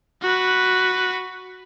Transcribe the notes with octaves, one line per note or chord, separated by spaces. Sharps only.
F#4 B4